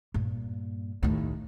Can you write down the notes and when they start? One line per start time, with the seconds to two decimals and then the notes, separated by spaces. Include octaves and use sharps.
0.14 G2 A#2
1.03 D#2 A2